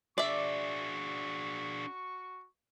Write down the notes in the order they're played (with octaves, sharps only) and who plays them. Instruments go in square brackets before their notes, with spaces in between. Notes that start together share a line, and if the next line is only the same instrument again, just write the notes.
[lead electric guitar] D4 G#4 [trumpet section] F#4 C#6 [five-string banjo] D5 E5